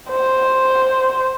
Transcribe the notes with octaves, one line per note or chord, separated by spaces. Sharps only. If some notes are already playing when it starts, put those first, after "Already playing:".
C5